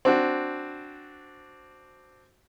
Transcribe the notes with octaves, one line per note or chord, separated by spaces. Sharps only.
C4 D4 F#4